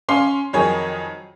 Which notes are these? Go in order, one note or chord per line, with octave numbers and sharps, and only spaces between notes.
C#4 F5 C6 C7
F2 D#3 F#3 G#4 C#5